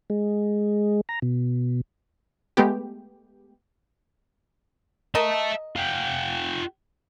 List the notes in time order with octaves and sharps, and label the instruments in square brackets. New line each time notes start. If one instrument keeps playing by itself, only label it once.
[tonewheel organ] G#3
A#5
B2
[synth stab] G#3 A3 B3 G4
[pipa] A#4 D#5 [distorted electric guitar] E5 A5
[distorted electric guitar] F4 G4